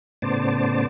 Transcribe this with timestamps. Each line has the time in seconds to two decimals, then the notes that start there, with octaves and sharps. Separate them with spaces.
0.22 A2 C#3 B3 C5 D5 A5